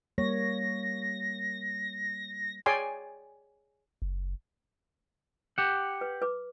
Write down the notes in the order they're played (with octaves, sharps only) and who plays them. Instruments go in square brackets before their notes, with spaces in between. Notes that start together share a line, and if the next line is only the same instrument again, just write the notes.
[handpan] G3 A#3 C#5 [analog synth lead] A#6
[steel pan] G#4 C#5 D5 G5 G#5 C6
[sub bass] F#1
[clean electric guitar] G4 F#5
[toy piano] B4
B4 D6